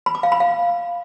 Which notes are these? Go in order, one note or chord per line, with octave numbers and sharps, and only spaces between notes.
B5
D6
F5
B5
F5